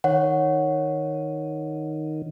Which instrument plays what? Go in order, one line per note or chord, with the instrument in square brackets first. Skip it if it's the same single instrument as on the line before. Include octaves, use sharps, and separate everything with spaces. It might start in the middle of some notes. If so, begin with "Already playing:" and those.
[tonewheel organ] D#3 [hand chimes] C#5 F#5